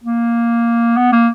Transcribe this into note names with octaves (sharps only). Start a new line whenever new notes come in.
A#3
B3
A#3